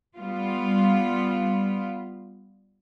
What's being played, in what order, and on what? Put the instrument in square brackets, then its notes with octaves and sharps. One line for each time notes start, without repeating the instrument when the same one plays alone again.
[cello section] G3 B3 F4